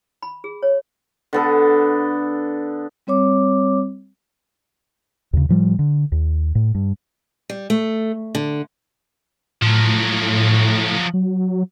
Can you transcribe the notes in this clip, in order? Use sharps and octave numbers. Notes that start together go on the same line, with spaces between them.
B5
G#4
C#5
D3 B3 A4
G3 C4 C#5 D6
D#2 C#3
A2 F3 G3
D3
D#2
A2
G2
G3
A3
D3
A2 F3 F#3
F#3